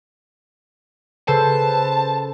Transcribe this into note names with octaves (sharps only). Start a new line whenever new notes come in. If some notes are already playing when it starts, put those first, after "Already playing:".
C#3 A4 B4 C5 A5